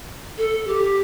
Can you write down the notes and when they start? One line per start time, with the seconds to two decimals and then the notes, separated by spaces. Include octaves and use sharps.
0.37 A4
0.67 G4